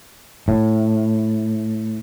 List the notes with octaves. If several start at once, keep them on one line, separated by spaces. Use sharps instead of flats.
A2